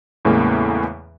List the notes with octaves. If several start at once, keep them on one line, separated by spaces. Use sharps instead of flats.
E2 A2 C#3 E3 G#3 A#3